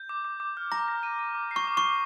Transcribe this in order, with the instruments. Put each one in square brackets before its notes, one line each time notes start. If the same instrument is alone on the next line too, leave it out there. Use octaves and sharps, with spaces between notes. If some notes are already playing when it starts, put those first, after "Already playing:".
Already playing: [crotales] G6
D6
D6
D6
F6
[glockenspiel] A#5 [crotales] A#6
[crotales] A#6
D#7
D#7
D6
C7
[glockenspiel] C#6
[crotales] D6
[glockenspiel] C#6
[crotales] D6